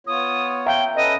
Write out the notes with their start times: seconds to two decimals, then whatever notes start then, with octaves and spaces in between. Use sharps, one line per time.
0.07 B3 F4 C#5 D#6
0.66 E5 F5 G5 A#5
0.96 C#4 A4 B4 D#5